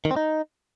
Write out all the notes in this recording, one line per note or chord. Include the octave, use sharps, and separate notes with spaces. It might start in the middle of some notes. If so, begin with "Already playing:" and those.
D#3
C4
D#4